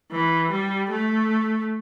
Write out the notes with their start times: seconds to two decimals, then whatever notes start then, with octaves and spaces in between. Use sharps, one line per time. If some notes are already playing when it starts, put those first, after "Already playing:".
0.11 E3
0.51 G3
0.90 A3